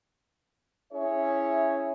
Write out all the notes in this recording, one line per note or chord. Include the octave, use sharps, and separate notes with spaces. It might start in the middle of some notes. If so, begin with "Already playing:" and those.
C#4 E4 G#4 C#5 E5